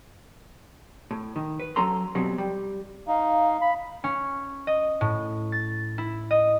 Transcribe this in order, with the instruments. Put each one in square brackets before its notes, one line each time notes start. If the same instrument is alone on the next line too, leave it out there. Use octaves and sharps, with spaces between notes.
[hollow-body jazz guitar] A2
D#3
B4
F#3 C#4 A4 A#5 C6
B2 F#3 G3 C4
G3
[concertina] D#4 [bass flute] F5
[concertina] B5
[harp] C#4
D#5
A2
A6
E4
D#5